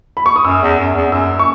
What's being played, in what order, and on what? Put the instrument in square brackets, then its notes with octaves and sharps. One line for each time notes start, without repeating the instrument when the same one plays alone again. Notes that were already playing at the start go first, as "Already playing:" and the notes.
[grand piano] B5
C#6
D#6
[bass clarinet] F#2 [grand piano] E6
[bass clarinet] E2
F#2
E2
[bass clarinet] F#2 [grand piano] E6
[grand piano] C#6